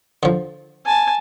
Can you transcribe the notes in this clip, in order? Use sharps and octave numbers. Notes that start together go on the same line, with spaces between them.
D3 F3
G#5 A5